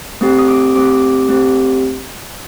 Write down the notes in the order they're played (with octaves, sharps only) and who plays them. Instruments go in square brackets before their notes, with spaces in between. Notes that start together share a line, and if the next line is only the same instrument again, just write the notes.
[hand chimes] A3 C4 G4
D#6
D6
A3 C4 G4 D6
A3 C4 G4